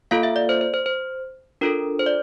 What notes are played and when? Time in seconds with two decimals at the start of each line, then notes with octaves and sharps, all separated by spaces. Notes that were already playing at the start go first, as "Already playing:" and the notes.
0.11 A#3 F4 A4 F5
0.23 E5
0.36 D5
0.49 C5
0.61 C5
0.74 C5
0.86 C5
1.61 D4 F4 A4 A#4
1.99 C5
2.06 D5